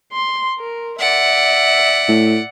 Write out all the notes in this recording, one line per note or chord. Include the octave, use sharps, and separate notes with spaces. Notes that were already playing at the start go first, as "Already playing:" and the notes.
C6
A#4
D5 E5 F#5
A2